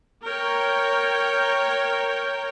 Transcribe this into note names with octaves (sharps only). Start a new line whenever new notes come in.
A#4 C#5 G5